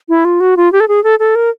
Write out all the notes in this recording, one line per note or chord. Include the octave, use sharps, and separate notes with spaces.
E4
F4
F#4
F4
G4
A4
G#4
A4
A4
A#4